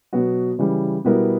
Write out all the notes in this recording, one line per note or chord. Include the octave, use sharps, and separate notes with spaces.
B2 F#3 B3 F#4
C#3 E3 G3
B2 G3 B3 E4 A#4